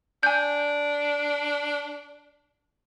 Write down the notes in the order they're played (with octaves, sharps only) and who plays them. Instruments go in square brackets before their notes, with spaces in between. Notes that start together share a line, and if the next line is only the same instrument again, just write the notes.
[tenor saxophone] D4 [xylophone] G#5 G6